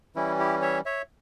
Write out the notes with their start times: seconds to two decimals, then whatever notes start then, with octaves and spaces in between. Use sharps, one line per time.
0.15 E3 G3 C#4 E4
0.39 E4 G4
0.62 C#5 E5
0.86 C#5 E5